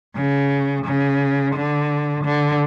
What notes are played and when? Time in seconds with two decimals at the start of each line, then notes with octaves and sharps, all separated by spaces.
0.15 C#3
0.85 C#3
1.55 D3
2.24 D3